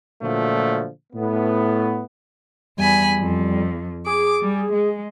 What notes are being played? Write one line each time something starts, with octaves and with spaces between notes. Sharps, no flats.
A#2 D3 F3 F#3 A3
A2 A3 B3
E2 G3 G#5 B5
F2
G#4 D6
G3
G#3